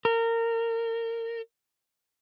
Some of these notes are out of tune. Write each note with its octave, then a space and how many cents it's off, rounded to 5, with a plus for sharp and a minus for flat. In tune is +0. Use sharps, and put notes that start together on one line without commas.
A#4 -25